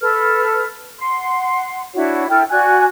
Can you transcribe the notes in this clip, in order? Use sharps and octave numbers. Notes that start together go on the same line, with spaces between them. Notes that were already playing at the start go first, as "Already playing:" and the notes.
A4 B4 F6
F#5 C6
D4 E4 F#4 C#5
E4 A4 G5 F6
F#4 D5 G#5 F#6